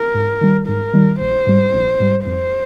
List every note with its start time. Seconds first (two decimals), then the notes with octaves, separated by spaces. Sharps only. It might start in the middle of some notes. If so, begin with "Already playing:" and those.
Already playing: A#4
0.14 G#2
0.41 D#3 G3
0.68 G#2 A#4
0.94 D#3 G3
1.20 A#1 C5
1.47 G#2 G3
1.74 A#1
2.00 G#2 G3
2.27 F2 C5